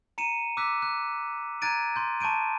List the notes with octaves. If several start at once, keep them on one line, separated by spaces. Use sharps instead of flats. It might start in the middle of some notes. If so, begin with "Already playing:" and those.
A#5 C#7 D#7 E7
D6 E6 F#6 B6
F#6
A#5 F#6 G#6 A6 D7 D#7
C6 G6
A5 C#6 G6 D7 D#7